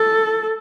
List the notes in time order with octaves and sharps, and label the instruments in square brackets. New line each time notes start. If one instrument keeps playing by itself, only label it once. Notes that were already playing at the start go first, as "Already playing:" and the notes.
Already playing: [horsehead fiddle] A4